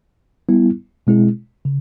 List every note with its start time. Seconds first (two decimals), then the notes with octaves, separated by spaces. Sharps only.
0.49 G3 B3 E4
1.07 B2 G#3 C4 E4 G#4
1.65 C#3